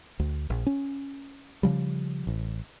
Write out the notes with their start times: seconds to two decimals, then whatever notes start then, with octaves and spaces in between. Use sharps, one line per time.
0.19 D2
0.50 A#1
0.67 C#4
1.63 C#3 F3 G3
2.27 A1